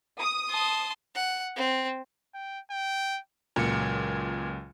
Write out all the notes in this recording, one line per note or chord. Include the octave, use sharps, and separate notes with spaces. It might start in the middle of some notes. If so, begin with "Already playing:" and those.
D#6
A5 C6
F#5
C4
G5
G5
C#2 A#2 F#3 C#7